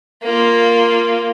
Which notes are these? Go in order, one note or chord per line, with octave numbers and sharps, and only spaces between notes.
A#3 F4